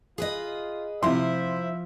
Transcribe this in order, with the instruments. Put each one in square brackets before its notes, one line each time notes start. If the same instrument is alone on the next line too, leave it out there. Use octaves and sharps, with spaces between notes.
[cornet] F4 [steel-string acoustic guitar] G#4 B4 D#5
[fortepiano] C3 C6 [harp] F3 [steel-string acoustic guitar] E4 C5 [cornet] E5